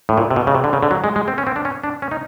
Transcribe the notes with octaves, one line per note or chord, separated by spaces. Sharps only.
A2
A#2
C3
B2
C#3
C3
D3
C#3
D3
F#3
G#3
G#3
C4
C#4
C4
D4
C#4
D4
C#4
D#4